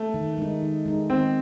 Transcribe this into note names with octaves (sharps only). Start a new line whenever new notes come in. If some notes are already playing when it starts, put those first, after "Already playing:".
Already playing: A3
D#3
G#3 D#4
D#3
G#3 D#4
D#3 C4